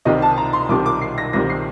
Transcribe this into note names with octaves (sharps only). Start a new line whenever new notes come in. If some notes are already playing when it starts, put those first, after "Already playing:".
C2 C3 D#3 G3 D#5
A5
A#5
C6
C2 C3 D#3 G3 D6
D6
C7
A#6
C2 C3 D#3 G3 A#6
C7